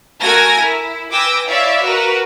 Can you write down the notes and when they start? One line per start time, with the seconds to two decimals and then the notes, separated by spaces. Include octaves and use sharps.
0.21 A3 F#4 A#4 G#5 G#6 A#6
0.58 E4
1.12 B4 G5 G#5 D6 E6 A#6
1.47 E4 C#5 D5 E5 F5
1.82 F#4 A#4 B4